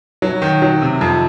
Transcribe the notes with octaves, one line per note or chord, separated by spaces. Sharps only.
F#3
D#3
F#3
C3
F2